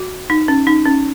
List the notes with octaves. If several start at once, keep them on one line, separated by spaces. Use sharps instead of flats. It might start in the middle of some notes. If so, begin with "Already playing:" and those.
Already playing: F#4
D#4
C#4
D#4
C#4